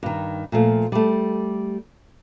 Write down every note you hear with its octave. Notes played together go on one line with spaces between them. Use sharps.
G2 D#3
A#2 F3 A3
G3 A3